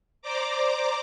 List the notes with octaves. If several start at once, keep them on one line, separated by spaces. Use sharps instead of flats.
C5 D5 A#5 D6